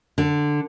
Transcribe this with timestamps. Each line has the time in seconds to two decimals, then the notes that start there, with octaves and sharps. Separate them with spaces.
0.18 D3